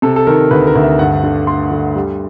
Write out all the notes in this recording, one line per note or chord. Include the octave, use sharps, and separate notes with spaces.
C3 A4
A4
D#3 A#4
D2 B4
A#4
D2
E5
G2 F#5
D3
A3 C6
D3
G3